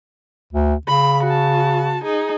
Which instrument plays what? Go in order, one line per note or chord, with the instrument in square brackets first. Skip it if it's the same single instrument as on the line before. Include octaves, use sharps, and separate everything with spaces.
[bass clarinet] D2
[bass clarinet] C#3 [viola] B5
[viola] F#4 A5
D#4 G#4